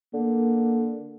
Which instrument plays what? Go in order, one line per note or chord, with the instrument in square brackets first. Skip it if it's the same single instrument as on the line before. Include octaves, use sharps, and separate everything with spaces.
[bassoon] D3 [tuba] A#3